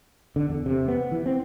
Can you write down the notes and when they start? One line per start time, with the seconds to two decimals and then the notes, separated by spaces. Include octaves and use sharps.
0.36 D3
0.49 E2
0.66 C3
0.88 B3
1.12 E3
1.26 C4